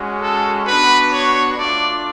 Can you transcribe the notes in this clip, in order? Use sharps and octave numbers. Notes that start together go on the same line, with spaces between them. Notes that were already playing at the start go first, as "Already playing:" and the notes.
Already playing: G#3 C#4 F#4
A4
B3 D4 F#4 B4
C#5
A3 D4 F4 D5